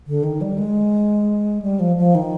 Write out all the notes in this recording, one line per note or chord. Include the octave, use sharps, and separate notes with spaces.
D3
D#3
G3
G#3
G3
F3
F3
D#3